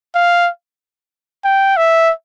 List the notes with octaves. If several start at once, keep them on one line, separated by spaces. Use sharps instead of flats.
F5
G5
E5